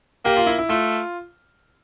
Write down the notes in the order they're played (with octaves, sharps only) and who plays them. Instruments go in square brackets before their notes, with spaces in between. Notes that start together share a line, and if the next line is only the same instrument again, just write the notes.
[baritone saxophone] A#3 [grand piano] G4
[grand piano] F4
E4
E4
[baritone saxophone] A3 [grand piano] F4